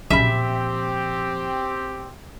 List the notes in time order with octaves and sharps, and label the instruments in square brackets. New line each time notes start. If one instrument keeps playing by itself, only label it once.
[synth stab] B1 C#3 B5 [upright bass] A#2 F3 [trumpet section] C4 G4 [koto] E5